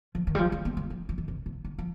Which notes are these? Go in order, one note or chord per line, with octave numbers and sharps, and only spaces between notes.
F3
D#3
G3
F3
G#3
B3
G#3
F3
F3
D#3
C3
C3
D3
F3